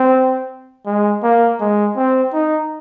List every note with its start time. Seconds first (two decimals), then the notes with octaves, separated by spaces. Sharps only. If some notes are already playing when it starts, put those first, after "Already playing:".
Already playing: C4
0.86 G#3
1.23 A#3
1.60 G#3
1.96 C4
2.33 D#4